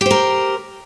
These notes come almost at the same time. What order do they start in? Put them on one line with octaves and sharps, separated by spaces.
G4 C5 A#4